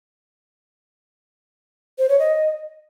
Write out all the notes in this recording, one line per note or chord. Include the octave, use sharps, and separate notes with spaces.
C5
C#5
D#5